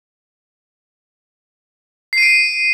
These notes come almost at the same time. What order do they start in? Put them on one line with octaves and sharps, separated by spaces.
C7 D#7 D7